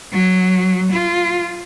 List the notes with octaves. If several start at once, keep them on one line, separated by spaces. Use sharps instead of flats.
F#3
F4